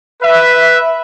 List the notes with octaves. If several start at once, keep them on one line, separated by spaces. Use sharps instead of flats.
B4 E5